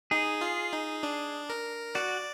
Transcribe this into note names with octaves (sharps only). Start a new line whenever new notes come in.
D#4 G#4
F4
D#4
D4
A#4
F#4 D5